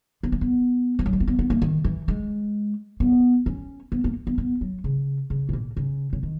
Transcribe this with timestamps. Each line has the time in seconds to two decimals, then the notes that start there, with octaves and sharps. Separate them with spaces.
0.23 B3
0.32 A#3
0.41 B3
0.99 E3
1.06 F#3
1.13 G#3
1.20 A#3
1.28 B3
1.39 B3
1.50 A#3
1.62 D#3
1.85 E3
2.08 G#3
3.00 B3
3.46 C#4
3.92 B3
4.04 A#3
4.27 B3
4.38 B3
4.61 F#3
4.84 C#3
5.30 C#3
5.49 G#2
5.53 A#2
5.77 C#3
6.13 C#3
6.23 D#3